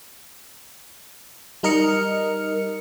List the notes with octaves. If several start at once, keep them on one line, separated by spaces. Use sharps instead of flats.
G3 D#4 A#4 D#5 F6 C#7